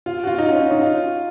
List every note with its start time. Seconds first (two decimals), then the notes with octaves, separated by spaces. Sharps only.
0.06 F4
0.24 F#4
0.27 F4
0.38 D#4
0.49 C#4
0.59 C#4
0.71 D#4
0.82 F4